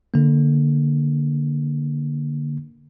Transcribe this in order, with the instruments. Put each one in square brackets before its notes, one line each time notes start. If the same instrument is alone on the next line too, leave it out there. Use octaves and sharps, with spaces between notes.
[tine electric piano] D3 A#3